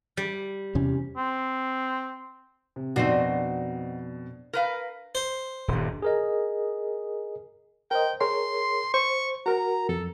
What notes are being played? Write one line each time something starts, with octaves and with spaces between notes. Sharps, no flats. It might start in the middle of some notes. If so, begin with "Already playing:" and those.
G3
E2 C3 C#4
C4
C3
F2 B2 C4 D4 D#4 F#4 C7
A#4 B4 F5
C5
D#1 G2
G#4 A#4 D#5
A#4 C5 D#5 G5
G#4 A#4 C#5 C6
C5 C#6
F#4 A#4 A#5
F2 A4